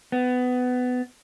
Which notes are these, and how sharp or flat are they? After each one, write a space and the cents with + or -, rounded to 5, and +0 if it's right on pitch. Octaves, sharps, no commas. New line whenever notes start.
B3 +20